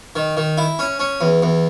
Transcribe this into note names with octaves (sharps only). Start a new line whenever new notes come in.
D#3
D#3
E4
C#4
C#4
E2
E2